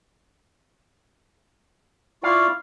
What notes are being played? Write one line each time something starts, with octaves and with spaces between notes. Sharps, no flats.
E4 F4 D5 F5 C#6